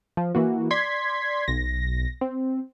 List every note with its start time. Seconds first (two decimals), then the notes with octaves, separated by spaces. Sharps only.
0.17 F3
0.35 E3 A#3 F#4
0.71 D5 C6 G#6 B6
1.48 B1 A#6
2.21 C4